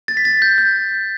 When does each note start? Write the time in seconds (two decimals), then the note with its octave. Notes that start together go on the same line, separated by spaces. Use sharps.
0.08 A6
0.17 B6
0.25 A6
0.42 G6
0.58 G6